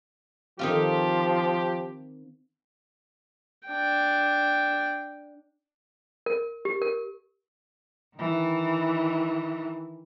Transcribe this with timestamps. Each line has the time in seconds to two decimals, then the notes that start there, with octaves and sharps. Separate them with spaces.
0.59 D#3 F3 C4 F4 G4
3.67 D4 G5
6.26 A#4
6.65 G4
6.82 A#4
8.16 D#3 E3